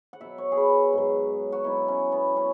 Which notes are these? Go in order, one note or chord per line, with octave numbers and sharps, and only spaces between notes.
F#5
B2 F#3 E5
C#5
G#4
B4
G#2
F#3
F#4
B2 F#3 E4
C#4
B3
F#3 C#4